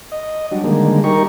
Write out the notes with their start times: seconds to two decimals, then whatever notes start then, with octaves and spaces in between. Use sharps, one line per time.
0.12 D#5
0.51 F#3 G3 D4
0.64 D3 D#3 G3 G#3 A#3
1.04 G3 D#4 G4 A#4 C#6